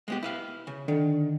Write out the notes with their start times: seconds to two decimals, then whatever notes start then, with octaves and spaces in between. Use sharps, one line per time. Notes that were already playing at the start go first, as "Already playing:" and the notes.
0.08 G#3 B3 G4
0.23 E4 B4 F5
0.67 C#3
0.88 D3 D#3